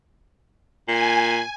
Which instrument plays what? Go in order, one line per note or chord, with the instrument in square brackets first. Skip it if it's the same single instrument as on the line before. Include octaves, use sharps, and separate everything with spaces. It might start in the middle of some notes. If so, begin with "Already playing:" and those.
[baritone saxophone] A#2 [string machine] G#5